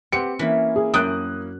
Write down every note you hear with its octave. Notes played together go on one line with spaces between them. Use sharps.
C4 G4 B4 F#5 C#7
E3 A#3 C#4 E4 B5
G#4
F#2 F#3 G5 D#6 F#6